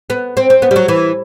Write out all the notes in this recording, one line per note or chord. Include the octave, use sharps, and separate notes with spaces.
B3
C4
C4
B3
G3
F#3
E3